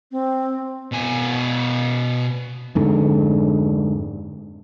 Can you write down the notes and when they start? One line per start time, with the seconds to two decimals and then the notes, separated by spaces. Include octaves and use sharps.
0.11 C4
0.92 B2 G#5
2.75 F2 G#2 D3